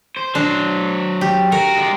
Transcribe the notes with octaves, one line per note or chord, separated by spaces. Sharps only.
C5
F#3 D4 C5
G4
F#4 A#4
G#3 D5